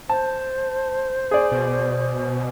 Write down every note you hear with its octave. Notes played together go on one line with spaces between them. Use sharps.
C5 A5
G#4 D5
B2